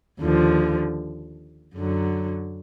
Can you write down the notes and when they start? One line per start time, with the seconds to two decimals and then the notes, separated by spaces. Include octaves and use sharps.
0.21 D#2 D3 F3
1.74 F#2 D3 F#3